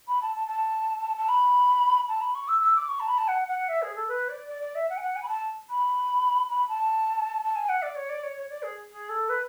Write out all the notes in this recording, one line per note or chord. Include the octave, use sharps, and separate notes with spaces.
B5
A5
A5
A5
A5
B5
A5
B5
C#6
E6
E6
D6
C#6
A5
B5
A5
F#5
F#5
E5
G#4
A4
B4
D5
D5
D5
E5
F#5
G#5
F#5
G#5
B5
A5
B5
B5
A5
A5
G#5
F#5
D5
C#5
D5
C#5
C#5
D5
G#4
G#4
A4
B4